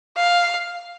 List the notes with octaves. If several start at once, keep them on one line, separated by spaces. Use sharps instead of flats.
F5